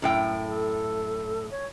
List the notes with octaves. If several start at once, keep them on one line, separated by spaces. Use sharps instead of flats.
F#2 A2 G5
A4
C#5